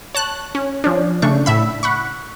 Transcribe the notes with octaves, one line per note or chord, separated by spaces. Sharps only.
C#5 A5 F#6
C#4
F3 C#4 D4
C#3 A3 D4 C#6
A2 E5 B5
F#5 B5 C#6